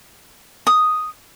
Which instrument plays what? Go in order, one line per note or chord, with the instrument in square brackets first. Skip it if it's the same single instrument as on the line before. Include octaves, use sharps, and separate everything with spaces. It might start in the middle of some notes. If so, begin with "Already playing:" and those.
[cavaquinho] D#6